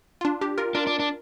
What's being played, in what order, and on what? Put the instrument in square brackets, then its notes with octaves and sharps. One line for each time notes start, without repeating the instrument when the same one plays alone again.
[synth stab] F4
D4
D4 G4
F4 A#4
[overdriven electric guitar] D4 [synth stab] F4 A#4
[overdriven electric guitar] D4
D4